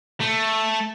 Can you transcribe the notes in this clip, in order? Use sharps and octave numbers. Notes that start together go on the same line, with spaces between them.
A3